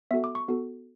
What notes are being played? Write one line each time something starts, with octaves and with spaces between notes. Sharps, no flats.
B3 F#4 A4 E5
D6
C#6
B3 F#4 A4